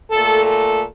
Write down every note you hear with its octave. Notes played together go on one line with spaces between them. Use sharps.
A#2 A3 A4
A4